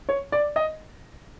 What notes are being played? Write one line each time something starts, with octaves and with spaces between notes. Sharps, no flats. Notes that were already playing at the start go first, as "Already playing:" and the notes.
C#5
D5
D#5